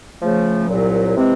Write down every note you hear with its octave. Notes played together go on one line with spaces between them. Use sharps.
C#3 F3 A3
C2 A#2 F#3
C3 E3 G#3 C4